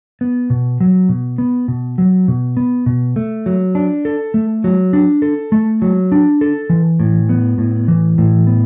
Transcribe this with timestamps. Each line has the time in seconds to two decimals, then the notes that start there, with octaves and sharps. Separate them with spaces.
0.21 B3
0.50 B2
0.80 F#3
1.09 B2
1.38 B3
1.68 B2
1.98 F#3
2.28 B2
2.57 B3
2.86 B2
3.16 A3
3.46 F#3
3.75 D4
4.05 A4
4.34 A3
4.64 F#3
4.93 D4
5.22 A4
5.52 A3
5.82 F#3
6.12 D4
6.41 A4
6.70 E3
7.00 A2
7.29 B3
7.58 A2
7.88 E3
8.18 A2
8.47 B3